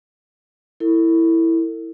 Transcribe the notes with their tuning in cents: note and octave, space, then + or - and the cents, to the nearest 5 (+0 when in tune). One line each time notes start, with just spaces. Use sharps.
E4 +0 A4 +40